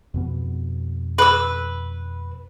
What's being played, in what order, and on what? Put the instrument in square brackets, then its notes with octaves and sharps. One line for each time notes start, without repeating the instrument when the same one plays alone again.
[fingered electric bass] F2 B2 B3
[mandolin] B4 E6